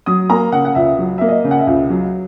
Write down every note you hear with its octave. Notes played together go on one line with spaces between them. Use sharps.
F#3 D#6
A#3 A#5
C#3 F#5
F#5
C#2 E5
F#3
A#3 E5
D#5
C#3
F#5
E5
C#2
F#3